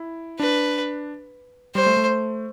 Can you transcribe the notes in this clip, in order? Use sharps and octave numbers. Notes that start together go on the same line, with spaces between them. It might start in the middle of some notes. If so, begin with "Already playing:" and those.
Already playing: E4
D4 B4
G3 C5
A3
A3